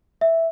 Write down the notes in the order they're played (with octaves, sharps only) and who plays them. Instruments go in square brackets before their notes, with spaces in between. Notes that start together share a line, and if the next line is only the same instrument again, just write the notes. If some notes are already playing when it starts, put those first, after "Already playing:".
[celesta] E5